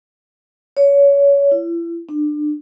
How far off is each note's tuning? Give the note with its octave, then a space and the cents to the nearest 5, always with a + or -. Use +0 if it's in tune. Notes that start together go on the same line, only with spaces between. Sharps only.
C#5 +25
E4 +35
D4 +30